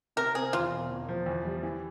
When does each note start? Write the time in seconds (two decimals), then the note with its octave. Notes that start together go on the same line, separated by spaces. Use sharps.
0.16 C3 A#4
0.35 C4 G#4
0.53 E2 F4
0.72 E1
0.90 E2
1.08 F3
1.26 E2
1.45 G3
1.63 E3